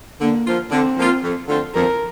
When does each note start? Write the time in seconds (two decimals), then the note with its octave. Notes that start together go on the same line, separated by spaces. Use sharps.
0.20 D3 A#3
0.46 F3 A#3 F4
0.71 D3 C4
0.98 F3 A#3 F4
1.23 F2
1.48 D3 A3 C4 F4
1.74 F2 A#4